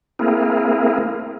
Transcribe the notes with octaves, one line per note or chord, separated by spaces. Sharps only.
A3 A#3 C4 E4 G#4 A#4